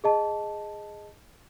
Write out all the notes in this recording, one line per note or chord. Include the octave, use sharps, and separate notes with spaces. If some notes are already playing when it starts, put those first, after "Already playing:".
G#4 D#5 A5